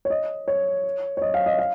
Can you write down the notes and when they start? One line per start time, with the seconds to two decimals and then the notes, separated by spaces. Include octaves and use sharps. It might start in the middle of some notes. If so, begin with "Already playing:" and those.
0.05 C#5
0.10 D#5
0.48 C#5
1.17 C#5
1.22 D#5
1.34 F5
1.46 D#5
1.59 F5